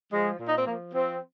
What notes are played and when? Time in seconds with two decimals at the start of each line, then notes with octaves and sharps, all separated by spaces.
0.12 F3 G#3
0.39 A#2
0.48 D#4
0.57 C4
0.66 F3 A#3
0.93 F3 C4